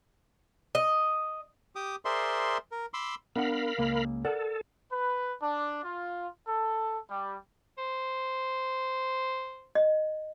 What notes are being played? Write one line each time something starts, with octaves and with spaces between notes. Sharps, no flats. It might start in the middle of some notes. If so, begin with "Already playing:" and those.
D#5
G4 D6 D#6
G#4 A#4 C5 D5 E5 C6
A#4
B5 C6 D6 E6
B3 D4 A#4 F5 F#5 B5
C#2 A#3
A4 A#4 D5 F#5
B4
D4
F4
A4
G3
C5
D#5